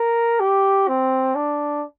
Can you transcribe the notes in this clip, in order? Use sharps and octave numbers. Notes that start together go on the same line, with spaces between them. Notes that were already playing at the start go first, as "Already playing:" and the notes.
Already playing: A#4
G4
C4
D4